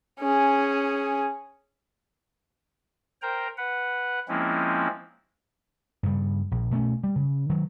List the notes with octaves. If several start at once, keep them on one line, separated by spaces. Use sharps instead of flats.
C#4 G#4
A#4 C5 G5 A#5
B4 F#5
F3 G#3 A#3 C4 C#4 E4
G2 C#3 G3
A#1
B2 A3 A#3 C#4
G3
C#3
D#3 F#3